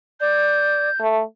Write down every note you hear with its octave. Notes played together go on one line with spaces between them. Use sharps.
D5 G6
A3